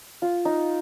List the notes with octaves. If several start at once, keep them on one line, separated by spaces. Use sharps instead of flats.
F4
D#4